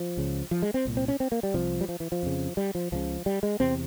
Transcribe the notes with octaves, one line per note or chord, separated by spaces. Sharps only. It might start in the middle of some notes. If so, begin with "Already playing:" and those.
Already playing: F3
C#2 C#3
F3
G#3
C4
C2 A#2
C4
C#4
C4
A#3
G3
C2 C3 F3
G3
F3
E3
F3
F2 C#3
G3
F3
C#2 C#3 F3
G3
G#3
E2 C3 C4